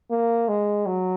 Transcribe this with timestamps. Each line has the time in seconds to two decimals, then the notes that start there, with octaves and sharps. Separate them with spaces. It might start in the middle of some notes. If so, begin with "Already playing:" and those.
0.11 A#3
0.48 G#3
0.86 F#3